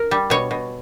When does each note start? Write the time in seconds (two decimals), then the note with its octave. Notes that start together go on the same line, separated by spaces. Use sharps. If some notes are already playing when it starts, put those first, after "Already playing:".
Already playing: A#4
0.11 G3
0.30 B2 C#5
0.51 B2